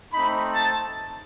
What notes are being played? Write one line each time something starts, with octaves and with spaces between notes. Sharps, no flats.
A3 C4 D#4 B5
A5